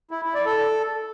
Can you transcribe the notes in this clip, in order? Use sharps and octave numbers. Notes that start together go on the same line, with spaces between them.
E4
E4
D5
A4